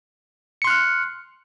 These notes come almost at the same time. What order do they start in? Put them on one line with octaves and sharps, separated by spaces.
C#7 C6 F#6 F6